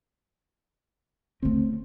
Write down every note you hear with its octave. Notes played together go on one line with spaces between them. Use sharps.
C#3 A3 C4